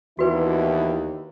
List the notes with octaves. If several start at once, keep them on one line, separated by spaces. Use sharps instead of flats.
D#2 E3 B3 D4 E4 F#4 B4